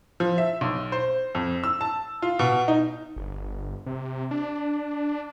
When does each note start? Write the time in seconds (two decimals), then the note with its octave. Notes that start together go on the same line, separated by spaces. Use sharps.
0.20 F3
0.38 E5
0.61 B1
0.92 C5
1.35 F2
1.64 E6
1.81 A5
2.22 F4
2.39 B2
2.68 D#4
3.16 G1
3.86 C3
4.31 D4